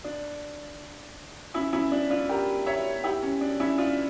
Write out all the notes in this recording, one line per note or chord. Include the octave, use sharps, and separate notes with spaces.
D4
C#4 E4
C#4 E4
D4
D4 F4
G4 A#4
C#5 E5
E4 G4
C#4
D4
C#4 E4
D4 F4